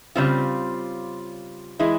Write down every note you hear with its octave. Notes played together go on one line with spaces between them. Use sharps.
C#3 G3 C4 F4
E3 G#3 E4